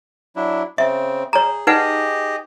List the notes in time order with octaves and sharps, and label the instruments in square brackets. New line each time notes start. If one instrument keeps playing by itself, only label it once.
[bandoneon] F#3 D4 E4
[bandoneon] C#3 C4 [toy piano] E5
[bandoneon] G#4 [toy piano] C#5 A#5
[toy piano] D#4 B4 F#5 [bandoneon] G4 G#4 D#5